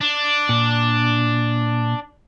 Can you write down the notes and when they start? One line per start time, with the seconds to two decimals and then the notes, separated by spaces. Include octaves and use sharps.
0.01 D4
0.49 A#2